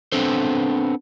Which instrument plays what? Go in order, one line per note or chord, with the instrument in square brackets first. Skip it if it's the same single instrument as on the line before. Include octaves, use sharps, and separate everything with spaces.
[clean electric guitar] B3 C4 D4 A4 C5